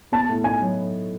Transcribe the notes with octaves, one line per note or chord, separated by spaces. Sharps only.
B3 A5
A2
D#4 G#5
F#3